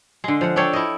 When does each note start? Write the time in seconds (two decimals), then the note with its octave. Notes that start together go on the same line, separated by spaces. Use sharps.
0.24 D3 G#3
0.41 F3 F#5
0.56 D4 A4 C#5 G5
0.73 E4 D#5